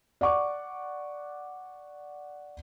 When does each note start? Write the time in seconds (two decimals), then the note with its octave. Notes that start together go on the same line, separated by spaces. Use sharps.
0.21 D5 F#5 C#6 D6